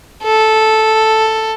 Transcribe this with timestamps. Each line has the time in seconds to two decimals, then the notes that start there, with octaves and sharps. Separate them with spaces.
0.23 A4